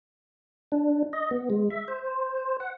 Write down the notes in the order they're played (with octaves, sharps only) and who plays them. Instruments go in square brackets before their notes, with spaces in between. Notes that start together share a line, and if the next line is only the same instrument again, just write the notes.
[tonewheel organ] D4
D#5
B3
G#3
E5
C5
F#5